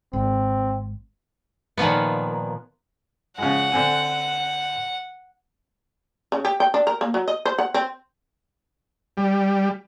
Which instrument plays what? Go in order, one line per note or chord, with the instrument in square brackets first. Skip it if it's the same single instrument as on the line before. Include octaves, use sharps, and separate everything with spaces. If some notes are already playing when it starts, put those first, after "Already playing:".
[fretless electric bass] G#1 [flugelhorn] C4
[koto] A#2 D#3 F3 B3
[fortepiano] C#3 F3 G#3 [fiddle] F#5
[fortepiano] D3 C4 G#5
[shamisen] C#3
G4
G5
D4
A#4
A#3
F#3
D#5
C5
F#5
C4
[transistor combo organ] G3